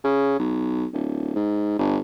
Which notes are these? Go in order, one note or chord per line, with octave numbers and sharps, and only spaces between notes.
C#3
B1
D1
G#2
G1